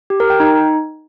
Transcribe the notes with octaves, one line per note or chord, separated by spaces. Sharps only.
G4
A#4
G5
D#4